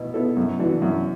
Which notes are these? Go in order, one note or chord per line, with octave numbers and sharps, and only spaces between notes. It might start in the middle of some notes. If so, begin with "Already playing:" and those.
Already playing: B2 B3 E4
B3 E4 A4
F#2
E3 D4 F#4
F#2